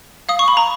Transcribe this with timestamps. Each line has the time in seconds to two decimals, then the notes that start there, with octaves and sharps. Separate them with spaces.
0.29 F5 D#6
0.39 C#6
0.48 B5
0.57 A#5